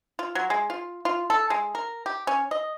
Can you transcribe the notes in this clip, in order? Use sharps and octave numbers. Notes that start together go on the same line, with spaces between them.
F4
F#3
G#3
F4
F4
A4
G#3
A#4
G4
C#4
D#5